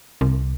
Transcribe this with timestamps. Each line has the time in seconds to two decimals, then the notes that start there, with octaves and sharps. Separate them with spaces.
0.21 C2